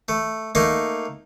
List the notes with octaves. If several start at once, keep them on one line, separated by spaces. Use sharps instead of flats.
A3
A3 A#3 D#4